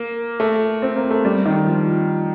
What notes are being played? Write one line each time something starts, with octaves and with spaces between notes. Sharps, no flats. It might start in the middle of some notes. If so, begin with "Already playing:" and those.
Already playing: A#3
A3
C4
A#3
A3
G3
D#3
F3